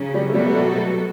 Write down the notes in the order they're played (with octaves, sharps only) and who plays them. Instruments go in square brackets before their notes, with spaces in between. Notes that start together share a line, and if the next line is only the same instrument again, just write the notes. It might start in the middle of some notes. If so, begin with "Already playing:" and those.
Already playing: [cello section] C#3 F#3 C#4
[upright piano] G3
A3
[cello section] B2 F#3 B3 F#4 A4 [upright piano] G3
[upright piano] A3
G3
A3